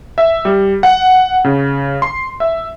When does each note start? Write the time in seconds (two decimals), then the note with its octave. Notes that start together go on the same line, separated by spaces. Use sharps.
0.18 E5
0.45 G3
0.83 F#5
1.44 C#3
2.02 C6
2.40 E5